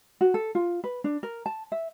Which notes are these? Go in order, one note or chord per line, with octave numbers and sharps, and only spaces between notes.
F#4
A4
F4
B4
D4
A#4
A5
E5